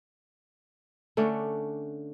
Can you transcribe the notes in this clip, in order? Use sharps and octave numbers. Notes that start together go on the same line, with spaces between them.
D3 A3 C#4 D4